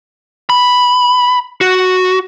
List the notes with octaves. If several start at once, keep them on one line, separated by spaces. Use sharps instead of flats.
B5
F#4